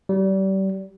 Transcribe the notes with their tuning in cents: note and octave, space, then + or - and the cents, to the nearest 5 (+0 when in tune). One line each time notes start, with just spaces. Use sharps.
G3 -30